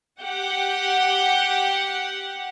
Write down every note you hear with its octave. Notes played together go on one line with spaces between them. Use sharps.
G4 F#5